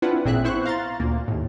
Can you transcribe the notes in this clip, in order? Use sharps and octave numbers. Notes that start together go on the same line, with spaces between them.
C4 D4 E4 F4 B4 F#5
A1 A#2 C4 G#4 E5 F#6
B3 E4 C5 C#6 F#6
F5 A#5 C6 A6
D2 A#2 A#3
D#2 A2